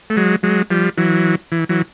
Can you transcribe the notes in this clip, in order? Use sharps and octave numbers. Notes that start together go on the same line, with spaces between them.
A3
F#3 G#3
F#3 G#3
F3 G3
E3 F#3
E3
E3 F#3